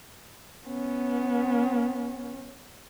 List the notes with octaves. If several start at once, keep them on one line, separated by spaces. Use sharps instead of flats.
B3 C#4